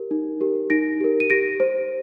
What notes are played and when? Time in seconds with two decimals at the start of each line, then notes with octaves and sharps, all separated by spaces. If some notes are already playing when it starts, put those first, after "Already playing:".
Already playing: G4 A#4
0.11 D#4
0.40 G4 A#4
0.70 D#4 A#6 D7
1.01 G4 A#4
1.20 D#7
1.30 G4 A#6 D7
1.60 C5